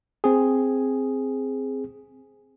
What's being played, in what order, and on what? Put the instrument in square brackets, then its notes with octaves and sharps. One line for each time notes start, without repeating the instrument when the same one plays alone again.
[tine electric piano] C4 G#4